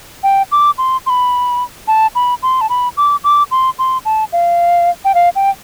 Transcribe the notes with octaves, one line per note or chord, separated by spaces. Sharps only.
G5
D6
C6
C6
B5
A5
B5
C6
A5
B5
D6
D6
C6
C6
A5
F5
G5
F5
G5